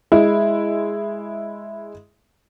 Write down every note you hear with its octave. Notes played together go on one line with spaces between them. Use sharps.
G#3 E4